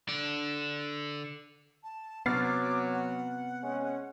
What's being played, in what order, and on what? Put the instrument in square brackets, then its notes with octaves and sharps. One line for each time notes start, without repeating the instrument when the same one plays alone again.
[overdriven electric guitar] D3 D5
[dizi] A5
[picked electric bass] C3 B3 [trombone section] F#3 [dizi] D6 [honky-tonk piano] F6 A6 C7
[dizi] F#5
[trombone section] G#3 C#4